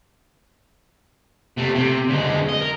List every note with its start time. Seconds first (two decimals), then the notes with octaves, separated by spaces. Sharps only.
1.57 C3 A3
1.74 C3
2.09 D2 G#3
2.48 D#5
2.61 A#4